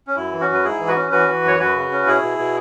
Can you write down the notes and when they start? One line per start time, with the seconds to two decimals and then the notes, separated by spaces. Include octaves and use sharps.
0.07 C#4
0.16 F#2 E4
0.32 E3
0.40 C#4 F#4
0.48 F#2
0.54 B4
0.64 G#2 E4 G#4
0.79 E3
0.88 F#4 B4
0.96 C#4
1.12 E3 F#4 B4
1.28 E3
1.44 F#2 C#5
1.59 F#2 F#4 B4
1.76 C#3
1.92 C#4
2.06 B2 E4 G#4
2.22 B2
2.38 B2